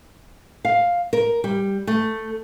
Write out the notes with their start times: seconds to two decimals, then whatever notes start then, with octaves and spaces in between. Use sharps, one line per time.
0.65 F5
1.13 A#4
1.44 G3
1.87 A3